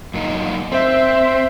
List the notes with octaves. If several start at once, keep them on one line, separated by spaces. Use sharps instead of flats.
F#2 A#3 D#4
C4 C5 E5